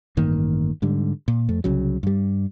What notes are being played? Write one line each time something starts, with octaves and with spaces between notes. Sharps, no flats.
A1 G2 D#3 A#3
G#2 D3 G3
A#2
F2 A3
C2 C#3 F#3
G2 G3